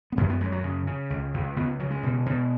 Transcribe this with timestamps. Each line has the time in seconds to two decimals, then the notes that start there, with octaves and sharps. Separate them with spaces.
0.12 B3
0.17 F#2 G#3
0.30 B3
0.41 F#2 G#3
0.52 F#3
0.64 C#3
0.87 C#3
1.10 C#2
1.34 C#2
1.56 C#2 B3
1.79 C#3 F#3
1.91 G#3
2.03 B2
2.26 B2